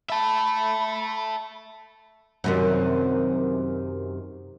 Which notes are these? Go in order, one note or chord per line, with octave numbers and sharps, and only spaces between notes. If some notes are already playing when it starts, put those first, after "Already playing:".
E5 A5 B5
F#2 C3 D#3